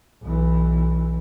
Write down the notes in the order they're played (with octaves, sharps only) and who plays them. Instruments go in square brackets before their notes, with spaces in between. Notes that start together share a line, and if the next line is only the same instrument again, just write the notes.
[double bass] B1 E3